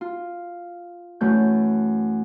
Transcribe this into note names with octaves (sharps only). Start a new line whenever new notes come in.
F4
F#2 E3 A3 G6